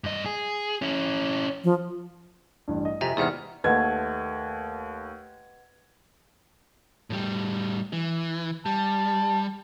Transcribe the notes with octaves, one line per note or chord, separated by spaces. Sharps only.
G2 D#5
G#4
C#4 E4
F3
A1 G2
D#5
F2 C3 E5 G#5 A#5
E2 G#2 C3 D5 F#5 F6
D#2 A3 B4 D#5 F#5 G#6
A2 G3
E3
G3 A5